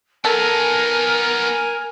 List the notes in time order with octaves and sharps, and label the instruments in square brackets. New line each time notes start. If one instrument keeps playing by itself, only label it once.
[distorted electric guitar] B3 D#4 [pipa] A4 [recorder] A#4 [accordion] G#5